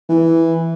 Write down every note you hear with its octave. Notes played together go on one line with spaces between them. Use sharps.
E3